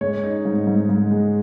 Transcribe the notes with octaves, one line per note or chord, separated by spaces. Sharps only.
G#3 C#5
D#4
G#2
G#2
G#2
G#3